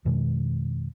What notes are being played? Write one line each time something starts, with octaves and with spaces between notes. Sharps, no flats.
F2 B2 D#3 G#3